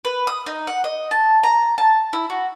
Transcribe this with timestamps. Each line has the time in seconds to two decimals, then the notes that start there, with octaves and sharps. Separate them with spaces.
0.05 B4
0.27 D#6
0.46 D#4
0.67 F#5
0.84 D#5
1.11 A5
1.43 A#5
1.78 A5
2.13 E4
2.30 F#4